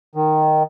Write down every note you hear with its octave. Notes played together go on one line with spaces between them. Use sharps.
D#3